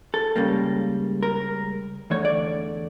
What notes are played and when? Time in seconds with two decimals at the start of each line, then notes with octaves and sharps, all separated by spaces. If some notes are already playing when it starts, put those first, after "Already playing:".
0.14 A4
0.36 C#2 C#3 G3 A#3
1.23 A#4
2.10 E2 D3 A3 C#5
2.25 D5